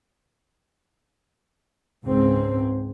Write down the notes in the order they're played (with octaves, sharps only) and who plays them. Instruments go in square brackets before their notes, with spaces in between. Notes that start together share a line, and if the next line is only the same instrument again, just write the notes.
[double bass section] C#2 G#2 C#3 G#3 C4